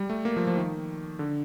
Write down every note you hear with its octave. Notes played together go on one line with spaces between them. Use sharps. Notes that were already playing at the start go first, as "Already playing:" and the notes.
Already playing: G3
A3
A#3
F3
F3
D#3
D3